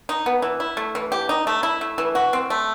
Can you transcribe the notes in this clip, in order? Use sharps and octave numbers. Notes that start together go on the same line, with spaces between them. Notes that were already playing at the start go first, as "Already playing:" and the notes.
D#4
B3
E3
E4
A3
E3
G4
D#4
A3
E4
A3
E3
F#4
C4
A3